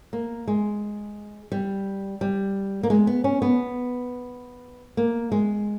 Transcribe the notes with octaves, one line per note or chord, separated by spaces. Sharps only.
A#3
G#3
G3
G3
A#3
G#3
B3
C#4
B3
A#3
G#3